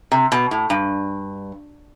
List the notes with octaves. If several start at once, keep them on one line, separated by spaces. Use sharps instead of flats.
C3
B2
A2
G2